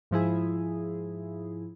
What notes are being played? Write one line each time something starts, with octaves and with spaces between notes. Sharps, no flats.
G#2 F3 E4 G#4